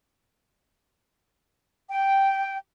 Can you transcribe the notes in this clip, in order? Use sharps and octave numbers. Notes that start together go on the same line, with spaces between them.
G5